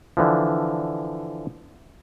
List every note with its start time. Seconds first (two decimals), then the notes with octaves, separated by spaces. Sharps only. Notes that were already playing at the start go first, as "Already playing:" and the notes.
0.17 D3 E3 F3